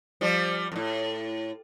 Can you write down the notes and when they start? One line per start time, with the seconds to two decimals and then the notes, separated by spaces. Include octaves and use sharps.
0.21 F3 G3
0.72 F2 A2